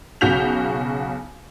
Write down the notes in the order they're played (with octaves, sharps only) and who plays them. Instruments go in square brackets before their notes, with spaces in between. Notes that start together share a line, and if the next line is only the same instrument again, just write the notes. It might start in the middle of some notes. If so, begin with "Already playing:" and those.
[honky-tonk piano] B1 C#3 F#4 G6 B6 F7